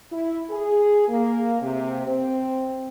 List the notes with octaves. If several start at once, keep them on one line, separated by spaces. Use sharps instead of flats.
E4
G#4
A#3
C3
C4